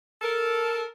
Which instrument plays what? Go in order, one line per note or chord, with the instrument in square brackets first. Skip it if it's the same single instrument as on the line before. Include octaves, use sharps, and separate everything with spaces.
[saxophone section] A4 A#4